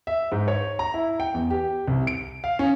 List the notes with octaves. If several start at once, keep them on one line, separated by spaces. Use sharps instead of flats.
E5
G#2
C#5
A#5
E4
G5
E2
G4
C2
D7
F5
C#4